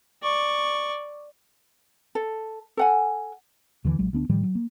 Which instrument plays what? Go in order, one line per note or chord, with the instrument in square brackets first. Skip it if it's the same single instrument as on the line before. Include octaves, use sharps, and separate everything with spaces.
[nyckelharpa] D5 C#6
[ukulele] A4
A4 F#5 G#5
[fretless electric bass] D#2 D3 E3
A#1 F#3 G#3
D2 B3 D4
A2 D#3 F3 G3
F#3
A#3